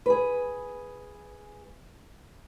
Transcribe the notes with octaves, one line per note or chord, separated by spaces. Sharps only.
G#4 B4